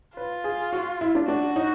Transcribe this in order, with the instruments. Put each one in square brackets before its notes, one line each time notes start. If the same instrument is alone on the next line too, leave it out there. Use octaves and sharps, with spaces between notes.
[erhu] F4 [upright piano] B4
[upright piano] G#4
F#4
E4
D4
[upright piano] D4 [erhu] F#4
[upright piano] D#4